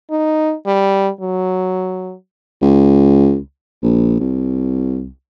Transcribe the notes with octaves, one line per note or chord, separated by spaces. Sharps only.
D#4
G3
F#3
C#2
A#1
C2